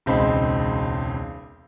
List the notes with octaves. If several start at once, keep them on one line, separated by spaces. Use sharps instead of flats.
E1 C#2 C4 D#4 G#4 B5